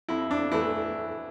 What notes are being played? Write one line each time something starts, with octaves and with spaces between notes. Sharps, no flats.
F2 E4
D4
E3 A3 E4